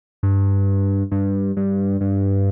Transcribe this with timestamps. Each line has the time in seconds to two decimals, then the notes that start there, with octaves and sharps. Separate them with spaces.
0.23 G2
1.12 G2
1.57 G2
2.01 G2